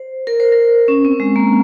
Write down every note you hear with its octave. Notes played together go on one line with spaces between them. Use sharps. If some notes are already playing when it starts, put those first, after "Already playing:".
Already playing: C5
A#4
C5
A#4
C#4
C4
G#3
A#3